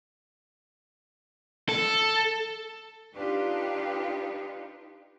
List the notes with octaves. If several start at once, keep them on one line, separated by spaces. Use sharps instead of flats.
A4
D4 D#4 F4 G4 B4